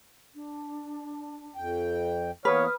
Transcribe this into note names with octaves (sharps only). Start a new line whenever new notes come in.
D4
F2 G5
E3 A#3 B3 B4 C#5 D#6 F6